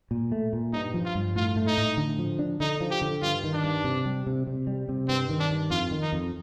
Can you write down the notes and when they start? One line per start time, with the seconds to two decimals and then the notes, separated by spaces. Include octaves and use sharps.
0.11 A#2
0.32 A3
0.53 A#2
0.73 G2 D#4
0.94 F3
1.05 F4
1.15 G2
1.35 A2 F4
1.56 A3
1.67 D#4
1.78 A2
1.97 D3
2.19 F3
2.39 D4
2.60 D3 D#4
2.81 F3
2.91 G4
3.02 D3
3.22 G2 F4
3.44 D#3
3.53 D4
3.64 G2
3.84 C3
4.06 G3
4.27 C3
4.47 C3
4.67 G3
4.89 C3
5.08 G2 C4
5.30 D#3
5.40 D4
5.51 G2
5.71 F2 F4
5.91 D#3
6.02 D#4
6.13 F2